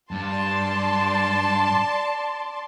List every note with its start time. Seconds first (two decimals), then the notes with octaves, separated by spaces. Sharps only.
0.11 G2 D5 A5 C6